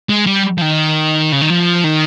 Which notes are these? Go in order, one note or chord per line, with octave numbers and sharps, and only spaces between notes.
G#3
G3
F3
D#3
C#3
D#3
F3
D#3